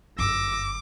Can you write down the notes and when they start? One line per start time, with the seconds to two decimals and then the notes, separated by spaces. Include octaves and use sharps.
0.19 G1 F#2 D6 E6 A#6